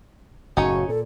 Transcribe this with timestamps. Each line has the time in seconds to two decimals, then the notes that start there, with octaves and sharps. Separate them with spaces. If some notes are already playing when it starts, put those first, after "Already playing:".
0.57 F#1 A2 C#4 D#4 F#4 C#5
0.89 A#2 A4